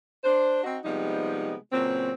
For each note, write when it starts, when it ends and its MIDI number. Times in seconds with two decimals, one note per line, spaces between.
0.24 0.62 62
0.24 0.62 72
0.64 0.78 60
0.64 0.78 63
0.64 0.78 66
0.85 1.54 48
0.85 1.54 53
0.85 1.54 55
0.85 1.54 56
0.85 1.54 59
0.85 1.54 63
1.72 2.12 46
1.72 2.12 49
1.72 2.12 54
1.72 2.12 59
1.72 2.12 60